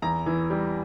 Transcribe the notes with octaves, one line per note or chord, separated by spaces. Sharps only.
E2 A#5
E3
G3